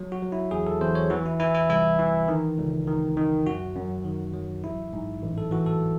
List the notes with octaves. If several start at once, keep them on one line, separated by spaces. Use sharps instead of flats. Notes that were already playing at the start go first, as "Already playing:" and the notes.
Already playing: F#3
F#4
F#3
E4
E2 G#4
A4
E2 C5
C#5
E3 F#4
E4
E3 E4
E4
C2 E4
E3
D#3
C#2
D#3
D#3
F#2 F#4
F#2
D#3
F#3
A1 E4
G#2
A1
A4
E3 F#4
A4